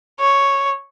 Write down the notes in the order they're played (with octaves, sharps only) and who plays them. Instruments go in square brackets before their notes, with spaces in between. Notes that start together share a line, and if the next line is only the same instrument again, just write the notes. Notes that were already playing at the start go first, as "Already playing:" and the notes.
[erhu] C#5